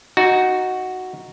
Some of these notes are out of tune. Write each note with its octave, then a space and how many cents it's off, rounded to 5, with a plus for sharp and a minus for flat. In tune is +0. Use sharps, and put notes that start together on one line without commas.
D#4 +0 F#4 +0